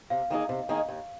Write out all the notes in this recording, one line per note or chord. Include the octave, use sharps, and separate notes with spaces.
C3 F5
D#3 A#3 D#4 G#4
C3
D#3 A#3 D#4 G#4
D#2